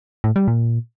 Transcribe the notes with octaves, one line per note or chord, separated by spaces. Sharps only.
A2
G3
A#2